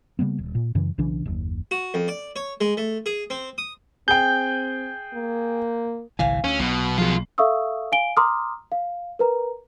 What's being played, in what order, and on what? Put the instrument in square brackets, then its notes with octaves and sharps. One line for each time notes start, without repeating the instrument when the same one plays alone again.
[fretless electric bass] C#3 G3 A#3 B3
D#1
A#2
F#2 C#3 E3
B1 C#3 E3 D4
F#1 D#2
[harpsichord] F#4
F2
D5
C#5
G#3
A3
G#4
C4
D#6
[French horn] C4 [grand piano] G#4 G5 [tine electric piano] G6
[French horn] A#3
[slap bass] G1 C2 E3 [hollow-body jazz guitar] F5 G#5
[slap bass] D2 [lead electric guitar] C#4
[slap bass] B1 [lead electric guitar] B2
[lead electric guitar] B2 F4 [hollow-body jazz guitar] F3 F#4 G#4
[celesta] A4 E5 F5 C#6 D#6 E6
F5 G#5 D7 G7
A#5 C6 D6 D#6 F6
F5
A#4 B4 A#5